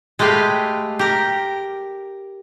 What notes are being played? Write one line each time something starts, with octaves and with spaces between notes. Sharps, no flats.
G#3 A3 G4 B4 F5
G4 A#4